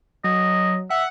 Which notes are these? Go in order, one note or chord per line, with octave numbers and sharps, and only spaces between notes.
F#3 D#5
E5 F#5